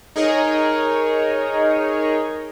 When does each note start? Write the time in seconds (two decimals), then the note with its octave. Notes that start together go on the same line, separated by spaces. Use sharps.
0.16 D#4 G#4 A#4 C#5 D#5